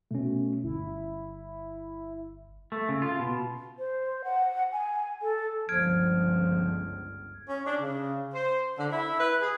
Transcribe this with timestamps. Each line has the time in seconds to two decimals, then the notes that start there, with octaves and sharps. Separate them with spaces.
0.11 B2 A3 C#4
0.64 G1 E4
2.72 A3
2.89 C#3
3.02 F4
3.19 B2
3.79 C5
4.24 F#5
4.72 G#5
5.22 A4
5.69 G1 C#2 F3 F6 G#6 D7
7.48 C#4
7.66 D4
7.80 C#3
8.33 C5
8.77 D3
8.90 E4
9.19 B4
9.41 G#4